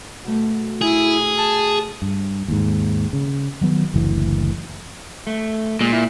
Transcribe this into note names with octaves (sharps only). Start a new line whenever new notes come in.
B2 A3
E4 G#4
A5
G2
D#2 G#2
C#3
D#3 F#3 B3
F#1 D2 E3
A3
A#2 G#3
E4